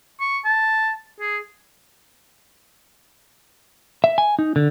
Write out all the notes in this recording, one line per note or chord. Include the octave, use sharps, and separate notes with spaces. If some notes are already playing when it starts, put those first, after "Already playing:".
C#6
A5
G#4
E5
G#5
D#4
D3